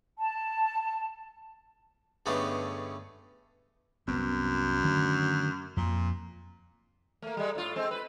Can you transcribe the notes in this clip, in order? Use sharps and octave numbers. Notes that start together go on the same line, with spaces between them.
A5
G2 D3 G#3 A3 B3 C#4
C2 F#2 B3 C4
D3 D#3 A3
F2 A#2
A3 A#3
G3 G#3
A2 F4
G#3 C4
B4